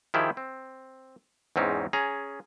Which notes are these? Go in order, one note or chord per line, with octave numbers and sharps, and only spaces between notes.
D#3 F3 E4 G4 G#4
C4
E2 G#2 C4 C#4 D#4
C#4 G#4 A#5